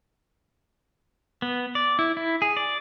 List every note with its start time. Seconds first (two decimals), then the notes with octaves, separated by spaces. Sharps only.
1.42 B3
1.75 D5
1.99 E4
2.17 E4
2.42 G#4
2.57 D5